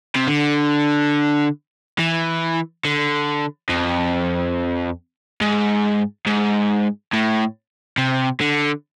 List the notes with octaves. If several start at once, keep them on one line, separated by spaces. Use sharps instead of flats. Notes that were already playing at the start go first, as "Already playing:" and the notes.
C3
D3
E3
D3
F2
G#2
G#2
A2
C3
D3